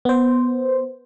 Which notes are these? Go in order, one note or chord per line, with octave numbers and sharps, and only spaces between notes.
B3 C5